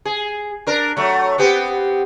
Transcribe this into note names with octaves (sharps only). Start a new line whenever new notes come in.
G#4
D4 A#4
F#3 A3
B3 C4 G4